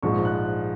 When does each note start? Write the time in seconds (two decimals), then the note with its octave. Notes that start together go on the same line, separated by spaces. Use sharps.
0.03 A#1 G#2 F3 G#3 C#6
0.25 F#6